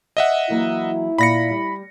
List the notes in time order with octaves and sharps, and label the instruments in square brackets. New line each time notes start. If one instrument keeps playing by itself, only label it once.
[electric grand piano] D#5 E5 F#5
[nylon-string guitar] E3 F#3 A#3 [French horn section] E4
[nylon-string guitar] A#2 [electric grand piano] B5 A#6 C#7
[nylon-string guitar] G3